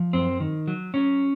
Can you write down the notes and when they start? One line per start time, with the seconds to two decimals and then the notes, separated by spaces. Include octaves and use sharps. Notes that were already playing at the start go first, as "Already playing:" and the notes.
Already playing: F3
0.13 F#2 C4
0.40 D#3
0.68 F#3
0.94 F#3 C#4